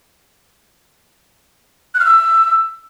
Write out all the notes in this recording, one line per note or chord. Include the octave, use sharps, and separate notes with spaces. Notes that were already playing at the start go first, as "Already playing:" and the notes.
F#6
F6
E6